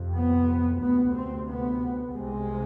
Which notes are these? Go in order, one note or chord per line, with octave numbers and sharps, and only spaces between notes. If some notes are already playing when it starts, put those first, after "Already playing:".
Already playing: F2 C3
B3
D2 C3 B3
C4
B3
C2 C3 G#3